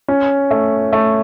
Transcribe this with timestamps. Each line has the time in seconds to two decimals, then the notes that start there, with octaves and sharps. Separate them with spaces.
0.08 C#4
0.51 A3
0.93 A3